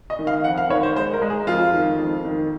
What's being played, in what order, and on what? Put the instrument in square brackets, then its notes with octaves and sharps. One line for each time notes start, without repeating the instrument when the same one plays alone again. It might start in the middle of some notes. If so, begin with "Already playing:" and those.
[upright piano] D#5
D#3
F5
F2 F#5
F5
D#3 C#5
C5
G#3 C5
A#4
G#3
G#4
F2 F4
D#3
F2
D#3